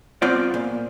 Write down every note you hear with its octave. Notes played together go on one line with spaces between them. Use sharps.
C2 B3 C4 F4 C5 D5
A#2